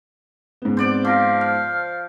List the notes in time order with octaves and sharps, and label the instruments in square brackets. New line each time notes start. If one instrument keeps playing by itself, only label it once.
[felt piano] G#2 B3
[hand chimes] C4 [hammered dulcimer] C5 D5 D6
[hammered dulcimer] F3 [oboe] F5 [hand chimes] D6 A#6
[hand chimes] F6